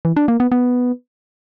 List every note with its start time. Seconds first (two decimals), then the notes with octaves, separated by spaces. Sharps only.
0.05 E3
0.17 D4
0.28 A#3
0.40 B3
0.52 B3